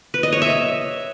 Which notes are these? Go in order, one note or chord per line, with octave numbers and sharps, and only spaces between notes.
B4
D#5
C#5
E5